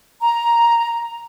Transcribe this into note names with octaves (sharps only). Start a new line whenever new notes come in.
A#5